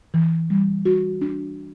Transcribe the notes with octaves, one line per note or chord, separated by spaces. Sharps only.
E3
G3
F#4
D4